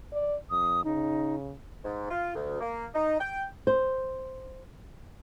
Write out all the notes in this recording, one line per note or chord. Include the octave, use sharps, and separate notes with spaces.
D5
F2 D#6
C#3 D#4
G#2
F4
D2
A#3
D#4
G5
C5